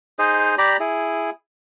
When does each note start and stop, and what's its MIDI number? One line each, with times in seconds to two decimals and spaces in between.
0.19 0.55 63
0.19 0.55 68
0.19 0.55 72
0.19 0.55 75
0.58 0.77 67
0.58 0.77 74
0.58 0.77 82
0.58 0.77 83
0.80 1.30 64
0.80 1.30 68